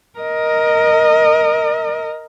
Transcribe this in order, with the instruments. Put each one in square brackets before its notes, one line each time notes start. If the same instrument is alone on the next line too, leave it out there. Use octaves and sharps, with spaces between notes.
[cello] A#4 D#5